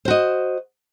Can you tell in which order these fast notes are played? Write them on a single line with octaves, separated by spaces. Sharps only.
C5 F#4 D#5